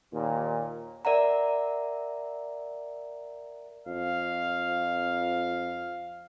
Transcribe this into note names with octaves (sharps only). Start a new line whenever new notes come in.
D#2 A#2
A#4 D5 E5 F#5 A#5
F2 F5